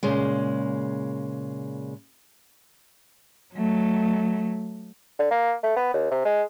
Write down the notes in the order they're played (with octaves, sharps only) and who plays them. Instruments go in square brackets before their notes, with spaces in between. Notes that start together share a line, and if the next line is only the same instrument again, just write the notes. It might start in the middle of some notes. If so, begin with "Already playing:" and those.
[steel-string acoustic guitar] A#2 C#3 G#3
[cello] F#3 A3
[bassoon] D3
A#3
A3
B3
D#2
C3
G#3